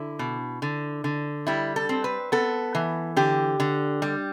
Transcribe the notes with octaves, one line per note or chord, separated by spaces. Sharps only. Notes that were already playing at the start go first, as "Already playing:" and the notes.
Already playing: D3 E4
B2
D3
D3
G3 E4
A4
C4
B4
B3 A4
E3
D3 G4
D3
G3